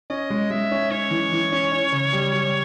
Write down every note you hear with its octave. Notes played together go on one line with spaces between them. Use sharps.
C#4 D#5
G#3
G#3 E5
C#4
C#4 C#5
E3
E3
C#4
C#4
C#3
G3
G3